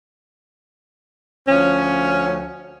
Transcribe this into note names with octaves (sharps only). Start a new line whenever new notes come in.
D2 F3 C#4